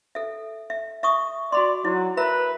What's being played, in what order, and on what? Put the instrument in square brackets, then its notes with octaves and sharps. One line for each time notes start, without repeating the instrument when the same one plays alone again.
[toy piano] A4 E5
E5
E5 C#6 D#6
[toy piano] F#4 B5 C6 [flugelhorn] D5
[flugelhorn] F#3 [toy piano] E4
[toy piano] A#4 E5 A#5 [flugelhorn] B4